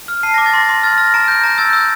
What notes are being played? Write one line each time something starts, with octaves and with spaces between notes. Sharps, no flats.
F6
A5 C7
D6 A#6
A6
C6 A#6
C6
F6 A6
F6 A#6
A#5 D7
G6 A#6
A#5 G6
E6 A6
E6 G6